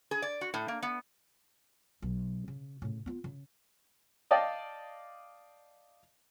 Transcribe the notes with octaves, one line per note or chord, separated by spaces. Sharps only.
G#4
D5
F#4
A2
A#3
B3
B1
C#3
A2 C#3
B3 F4
C#3
D5 D#5 F5 G5 A5 D#6